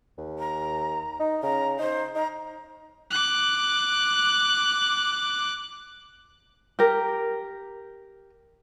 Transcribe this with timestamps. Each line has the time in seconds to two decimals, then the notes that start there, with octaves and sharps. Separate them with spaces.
0.18 D#2
0.39 A#5
1.20 D#4
1.43 C#3 A#5
1.79 D#4 C5
2.15 D#4 A#5
3.11 D6 F#6
6.79 G4 A#4